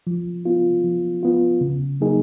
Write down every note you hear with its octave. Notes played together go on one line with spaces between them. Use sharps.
F3
B3 F4
F3
B3 F4
C#3
F#3 A#3 D#4 G#4